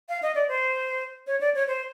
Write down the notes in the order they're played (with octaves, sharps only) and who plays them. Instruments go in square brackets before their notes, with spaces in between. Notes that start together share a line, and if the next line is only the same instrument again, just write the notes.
[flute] F5
D#5
D5
C5
C#5
D5
C#5
C5